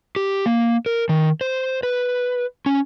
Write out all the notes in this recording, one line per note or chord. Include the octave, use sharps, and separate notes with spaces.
G4
A#3
A#4
D#3
C5
B4
C#4